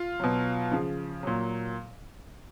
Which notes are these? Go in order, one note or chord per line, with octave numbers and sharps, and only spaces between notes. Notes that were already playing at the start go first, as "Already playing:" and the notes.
Already playing: F4
B2 F#3
C#3 F3
A#2 F#3